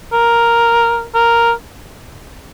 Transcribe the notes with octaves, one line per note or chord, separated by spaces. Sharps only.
A#4
A#4